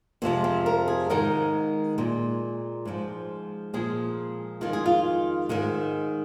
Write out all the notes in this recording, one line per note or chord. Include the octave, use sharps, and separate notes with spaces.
F2 C3 F3 G#3 C4
C4
A#4
G#4
G#2 D#3 G#3 A#4
A#2 G#3
G#2 F3 G#3
A#2 F3 G#3 G#4
F2 D#3 G#3 F4
G#4
F4
G#2 D#3 G#3